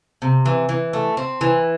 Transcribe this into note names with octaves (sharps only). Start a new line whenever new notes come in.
C3
E3
E3
A3
C4
E3